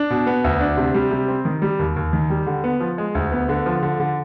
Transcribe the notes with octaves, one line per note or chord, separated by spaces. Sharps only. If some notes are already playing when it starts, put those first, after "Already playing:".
Already playing: D4
B2
B3
D2
D4
C3
G3
C3
C4
D#3
G3
D#2
D#2
D#3
G3
D3
B3
F3
G#3
D2
B3
D3
F3
D3
D3